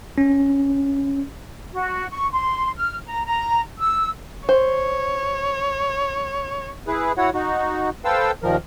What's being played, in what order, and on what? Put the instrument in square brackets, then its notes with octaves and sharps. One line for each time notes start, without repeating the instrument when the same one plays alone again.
[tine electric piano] C#4
[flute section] F#4
C#6
C6
F6
A#5
A#5
E6
[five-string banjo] C5 [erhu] C#5
[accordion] E4 G#4 B4
E4 F#4 C#5 F#5
D#4 F#4
A4 B4 C5 F5 G5 E6
D#2 A#2 D#3 F3 A#4